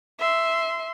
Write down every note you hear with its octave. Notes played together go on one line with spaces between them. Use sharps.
E5 C6